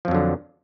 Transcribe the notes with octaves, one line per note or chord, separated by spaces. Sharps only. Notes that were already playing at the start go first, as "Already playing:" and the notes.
F2 D3 F3 F#3